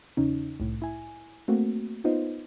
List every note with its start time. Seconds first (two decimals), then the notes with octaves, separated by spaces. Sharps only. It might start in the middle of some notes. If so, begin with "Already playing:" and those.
0.17 E2 C#3 C#4 D#4
0.60 C2 A2
0.82 E4 G#5
1.48 A3 A#3 C4 F#4
2.04 B3 D#4 F4 B4 C5 D#5